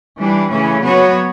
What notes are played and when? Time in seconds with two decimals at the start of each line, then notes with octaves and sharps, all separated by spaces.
0.17 E3 G3 D4
0.49 C#3 E3 A3 C#4
0.82 F#3 B3 F#4 C#5